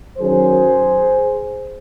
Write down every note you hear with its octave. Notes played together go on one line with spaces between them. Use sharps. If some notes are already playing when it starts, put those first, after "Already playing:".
F#2 D#3 F#3 G#4 C5